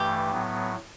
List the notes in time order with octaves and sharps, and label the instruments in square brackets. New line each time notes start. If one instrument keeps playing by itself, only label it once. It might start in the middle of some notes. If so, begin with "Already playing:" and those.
Already playing: [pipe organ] G2 E3 A3 [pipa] G4
[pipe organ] A2 F#3 B3